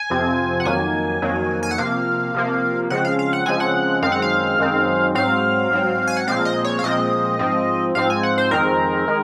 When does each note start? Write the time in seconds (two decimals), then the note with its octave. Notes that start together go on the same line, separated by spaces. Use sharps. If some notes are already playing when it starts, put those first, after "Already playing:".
Already playing: G#5
0.10 F2 C3 F3 C4
0.60 F#5
0.65 F2 D#3 F#3 A#3 G#5
1.22 F2 D#3 F#3 A#3
1.63 G#5
1.71 F#5
1.78 C3 F3 A#3 F5
2.34 C3 F3 A#3
2.90 C#3 F3 G#3 C4 F#5
3.05 F5
3.19 F5
3.33 F#5
3.46 C#3 F3 G#3 C4 G#5
3.60 F#5
4.02 F#2 D#3 G#3 C4 F5
4.12 F#5
4.22 F5
4.59 F#2 D#3 G#3 C4
5.15 G#2 F#3 C4 F5
5.70 G#2 F#3 C4
6.07 G#5
6.17 F#5
6.27 A#2 F3 G#3 C4 F5
6.45 D#5
6.64 C#5
6.79 F5
6.83 A#2 F3 G#3 C4 D#5
7.39 G#2 F3 C4
7.95 G#2 F3 C4 F5
8.10 G#5
8.23 F#5
8.38 C5
8.51 F2 D#3 G#3 C4 A#4
9.08 D#3 G#3